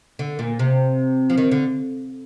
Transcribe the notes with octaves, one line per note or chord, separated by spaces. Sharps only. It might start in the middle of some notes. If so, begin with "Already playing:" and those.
D3
A#2
C3
F3
D#3
D3